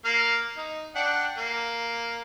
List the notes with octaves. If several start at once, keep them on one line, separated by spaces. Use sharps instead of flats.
A#3 F5
D#4
D4 F#5 G5
A#3